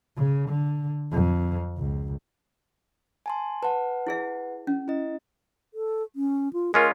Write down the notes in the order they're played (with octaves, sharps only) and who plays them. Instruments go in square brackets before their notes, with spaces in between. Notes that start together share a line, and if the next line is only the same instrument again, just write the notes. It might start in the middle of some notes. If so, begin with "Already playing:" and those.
[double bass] C#3
D3
F2
C#2
[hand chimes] G#5 A5 C6
[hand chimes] B4 F#5 [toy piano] A5
[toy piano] E4 G#4 E5
C#4
[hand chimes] E4 D#5
[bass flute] A4
C#4
F4
[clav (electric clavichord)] G#3 C#4 F4 [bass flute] A#4